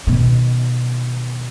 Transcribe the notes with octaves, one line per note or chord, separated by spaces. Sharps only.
B2 D#3